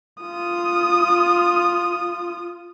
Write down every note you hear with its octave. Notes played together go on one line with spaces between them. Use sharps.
F4 D#6